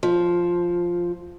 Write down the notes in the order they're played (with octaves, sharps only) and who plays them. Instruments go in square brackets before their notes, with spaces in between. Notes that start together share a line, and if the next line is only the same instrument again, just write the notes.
[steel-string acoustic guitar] F3